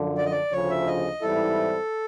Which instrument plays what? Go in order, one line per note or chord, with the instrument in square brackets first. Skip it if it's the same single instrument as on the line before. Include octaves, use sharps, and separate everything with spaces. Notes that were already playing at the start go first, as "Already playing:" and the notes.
Already playing: [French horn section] F#2 D3 F3
[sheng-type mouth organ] D5
D#5
D5
[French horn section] D2 C#3 F3 [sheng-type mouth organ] C#5
[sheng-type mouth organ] E5
D#5
[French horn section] G#2 E3 G3 C4 E4 [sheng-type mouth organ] A4